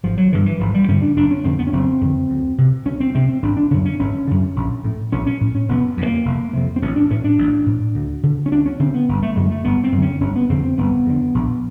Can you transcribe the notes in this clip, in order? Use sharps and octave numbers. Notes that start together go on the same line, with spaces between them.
G#1 F3
F#3
G2 D3 E3
E3
G#1 F3
G3
G2 D3 C#4
D4
F#1 D4
C#4
F2 D3 C4
B3
C#4
F#1 C4
F2 D3
D2
C3
D2 C#4
C4
C3 C4
C4
G#1 D4
D4
F#2 D3 C#4
C#4
G#1 C#4
F#2 D3
A#1
A2
A#1 C#4
C#4
A2
C#4
F1 B3
F2 C3
A#3
F1
F2 C3
C4
A1 C#4
D4
A2 C#4
D4
A1
A2
D2
D3
C#4
D2 D4
C#4
D3 C4
B3
G1
A3
F#2 D3 G#3
A3
G1 B3
C4
F#2
D3 C#4
G1 C#4
B3
F2 D3 C4
C4
G1 B3
F2 D3
A#1